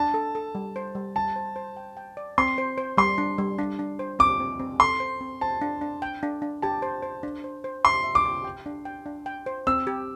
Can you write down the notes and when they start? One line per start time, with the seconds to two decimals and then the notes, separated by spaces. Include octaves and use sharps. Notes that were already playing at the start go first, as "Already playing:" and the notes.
Already playing: D4 A5
0.14 A4
0.35 A4
0.55 G3
0.76 C5
0.95 G3
1.16 G3 A5
1.36 C5
1.56 C5
1.77 G5
1.97 G5
2.17 D5
2.38 C4 C6
2.58 C5
2.78 C5
2.97 G3 C6
3.18 D4
3.38 G3
3.59 D4
3.79 D4
3.99 C5
4.19 C4 D6
4.40 C4
4.60 C4
4.80 A4 C6
5.00 C5
5.21 C4
5.41 C5 A5
5.62 D4
5.81 D4
6.02 G5
6.23 D4
6.42 D4
6.62 G4 A5
6.82 C5
7.03 C5
7.23 D4
7.44 C5
7.64 C5
7.85 E5 C6
8.04 E5
8.15 D6
8.25 G4
8.44 G5
8.66 D4
8.85 G5
9.06 D4
9.26 G5
9.46 C5
9.67 C4 E6
9.87 G4